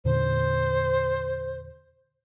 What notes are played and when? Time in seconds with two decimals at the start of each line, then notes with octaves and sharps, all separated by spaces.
0.05 E2 A#2 D3 C5